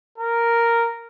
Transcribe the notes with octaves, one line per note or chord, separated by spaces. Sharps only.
A#4